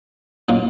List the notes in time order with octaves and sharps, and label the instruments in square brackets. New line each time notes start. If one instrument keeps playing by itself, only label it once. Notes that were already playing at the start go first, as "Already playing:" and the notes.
[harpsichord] A#2 F#3 A#3 D#4